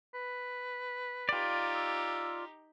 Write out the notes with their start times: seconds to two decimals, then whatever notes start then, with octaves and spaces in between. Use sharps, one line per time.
0.14 B4
1.29 D#4 F4 G4 D5
1.75 E6